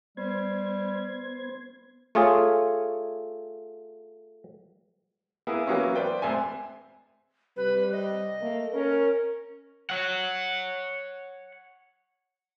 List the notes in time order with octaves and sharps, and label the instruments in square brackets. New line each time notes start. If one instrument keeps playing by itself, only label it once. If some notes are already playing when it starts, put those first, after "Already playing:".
[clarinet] G3 [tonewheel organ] B3 C5 G#6
[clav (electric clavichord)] A3 F4 G#4 C#5
[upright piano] A#3 B3 E4 G#4
E3 F#3 A#3 B3 C#4 E4
B4 C5 D5 G5
E1 A1 C4 E5 G#5
[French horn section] C3 G3 [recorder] B4
[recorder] D#5
[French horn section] A3 A#3
[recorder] C#4 [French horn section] A#4
[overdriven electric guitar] C#5 F#5